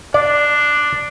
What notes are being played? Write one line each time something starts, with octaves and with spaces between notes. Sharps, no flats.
D4 D5